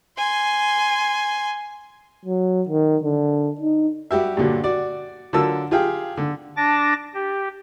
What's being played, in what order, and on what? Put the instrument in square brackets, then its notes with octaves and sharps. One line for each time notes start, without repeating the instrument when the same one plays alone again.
[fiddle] G#5 C6
[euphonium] F#3
D#3
D3
D#4
[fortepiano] G3 F#4 G4 E5
G2 A#2 D3 F#3
F#4 D5
D3 F#3 F4 A#4 A5 E6
F4 G4 G#4 F5 G5
D3
[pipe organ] D4 A5 D6 A#6
G4